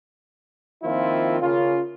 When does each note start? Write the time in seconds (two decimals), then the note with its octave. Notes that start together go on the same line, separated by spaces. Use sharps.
0.83 D#3 F3 A#3 C4 E4 F4
1.40 C#3 A#3 C#4 F4